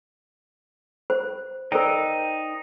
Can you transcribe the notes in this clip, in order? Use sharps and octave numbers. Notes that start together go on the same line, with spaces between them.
C5
D#4 A#4 C5 D5 G5